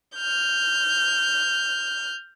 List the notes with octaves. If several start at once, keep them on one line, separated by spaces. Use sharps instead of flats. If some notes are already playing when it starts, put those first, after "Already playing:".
F6 G6